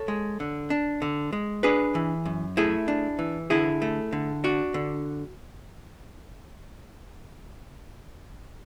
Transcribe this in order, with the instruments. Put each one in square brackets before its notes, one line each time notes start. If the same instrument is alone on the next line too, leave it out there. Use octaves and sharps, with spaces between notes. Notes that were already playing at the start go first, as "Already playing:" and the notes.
Already playing: [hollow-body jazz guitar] A4 C#5
G#3
D3
D4
D3
G#3
D4 G#4 B4
E3
F#2
A3 E4 G#4
D4
E3
D3 E4 G#4
A3
D3
D4 F#4
D3